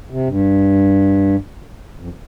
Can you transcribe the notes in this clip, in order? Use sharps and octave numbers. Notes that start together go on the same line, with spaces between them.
C3
G2
F2